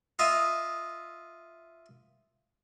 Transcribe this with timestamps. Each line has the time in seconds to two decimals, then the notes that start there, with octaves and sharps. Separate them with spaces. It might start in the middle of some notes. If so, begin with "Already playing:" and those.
0.19 F4 D#5 E5